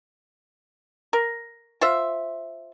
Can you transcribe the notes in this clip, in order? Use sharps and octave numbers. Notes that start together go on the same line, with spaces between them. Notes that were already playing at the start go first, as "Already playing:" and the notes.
A#4
F4 C5 E5